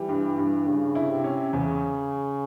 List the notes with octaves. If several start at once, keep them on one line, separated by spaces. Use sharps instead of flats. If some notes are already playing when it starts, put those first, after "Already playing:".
Already playing: E3 G3
G2
G2
G2 C#3
E4
C3
C#4
E2 C#3